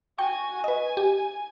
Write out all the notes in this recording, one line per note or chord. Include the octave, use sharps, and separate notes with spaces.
F#4 G5 G#5 C#6
B4 D#5 G#5
G4